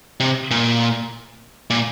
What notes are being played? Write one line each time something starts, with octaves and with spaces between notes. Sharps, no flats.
C3
A#2
A#2